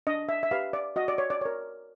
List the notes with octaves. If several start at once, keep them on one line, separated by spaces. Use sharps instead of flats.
D4 D#5
E5
E5
G4 B4 F5
D5
F#4 D#5
D5
C#5
D5
A#4 C#5